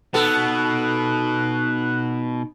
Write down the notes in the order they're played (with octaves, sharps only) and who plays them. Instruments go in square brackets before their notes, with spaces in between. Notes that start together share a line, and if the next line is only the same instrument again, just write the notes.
[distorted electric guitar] B2 F#5 [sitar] B3 A4 [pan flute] D#4 [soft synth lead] F#6